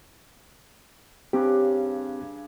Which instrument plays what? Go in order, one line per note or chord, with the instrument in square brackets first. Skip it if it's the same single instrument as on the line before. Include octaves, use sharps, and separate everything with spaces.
[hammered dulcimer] G2 C#3 D4 [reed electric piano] C4 G4